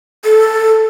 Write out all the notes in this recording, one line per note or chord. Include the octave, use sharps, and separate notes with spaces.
A4